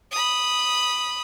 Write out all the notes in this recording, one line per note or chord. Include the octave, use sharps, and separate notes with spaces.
B5 D#6